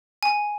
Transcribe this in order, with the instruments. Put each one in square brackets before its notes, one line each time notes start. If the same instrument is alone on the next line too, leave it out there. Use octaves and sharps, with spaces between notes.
[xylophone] G#5